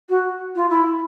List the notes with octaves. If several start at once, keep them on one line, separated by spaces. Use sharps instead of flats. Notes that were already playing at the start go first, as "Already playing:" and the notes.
F#4
F4
E4